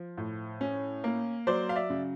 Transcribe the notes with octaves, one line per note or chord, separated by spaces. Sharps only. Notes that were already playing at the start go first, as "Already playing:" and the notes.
Already playing: F3
A2
C#4
A#3
F#3 C5 D5
F5
D5 E5
C#3